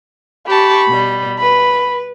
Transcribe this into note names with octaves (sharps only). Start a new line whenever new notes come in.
G4 A5 B5 C#6
B2 G3
B4 B5